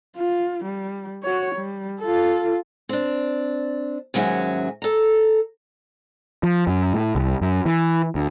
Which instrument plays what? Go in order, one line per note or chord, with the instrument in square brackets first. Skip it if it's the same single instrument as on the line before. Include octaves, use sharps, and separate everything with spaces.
[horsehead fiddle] F4
G3
F#4 C#5
G3
F4 A4
[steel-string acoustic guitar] C4 D4
D#2 G#2 F#3 C#4 G#4 E5
A4 A#5
[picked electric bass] F3
F#2
A2
C2
F#2
E3
D2